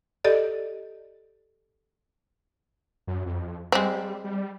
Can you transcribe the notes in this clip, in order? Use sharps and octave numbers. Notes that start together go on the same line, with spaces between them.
G4 A4 D5 D#5
F#2
F2
G3 G#3 C4
G3